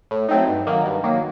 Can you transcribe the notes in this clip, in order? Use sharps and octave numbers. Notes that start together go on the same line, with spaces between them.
A2
F#3 A3 C4 D#4
G2
D#3 F#3 A#3
G2
D#3 F#3 A#3